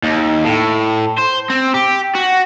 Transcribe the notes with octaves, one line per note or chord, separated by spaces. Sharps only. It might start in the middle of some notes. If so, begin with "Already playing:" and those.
D#2
A2
C5
C4
G4
F#4